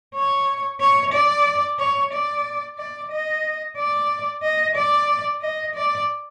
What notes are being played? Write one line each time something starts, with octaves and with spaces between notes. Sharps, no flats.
C#5
C#5
D5
C#5
D5
D5
D#5
D5
D#5
D5
D#5
D5